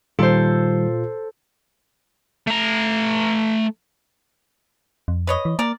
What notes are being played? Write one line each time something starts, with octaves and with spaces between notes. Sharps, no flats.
A#2 D#3 G3 F4 A4 C5
A3 A#5
F2
B4 C#5 D#5
E3
A#3 A#4 D5